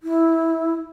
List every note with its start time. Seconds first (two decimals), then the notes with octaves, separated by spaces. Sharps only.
0.03 E4